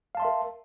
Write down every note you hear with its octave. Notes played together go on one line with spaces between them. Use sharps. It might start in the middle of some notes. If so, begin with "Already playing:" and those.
A#4 E5 F5 A5 C6